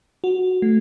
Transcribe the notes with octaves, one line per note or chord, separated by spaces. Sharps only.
F#4
A3